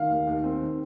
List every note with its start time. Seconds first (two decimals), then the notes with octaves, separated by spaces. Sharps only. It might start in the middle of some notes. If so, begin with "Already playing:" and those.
Already playing: D#3 F5
0.10 D#2
0.27 D#2
0.44 C4
0.62 D#3